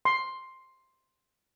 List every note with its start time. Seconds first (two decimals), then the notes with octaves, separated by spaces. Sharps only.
0.05 C6